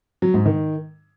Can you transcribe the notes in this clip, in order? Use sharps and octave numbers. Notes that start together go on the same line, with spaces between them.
F#3
G#2
D#3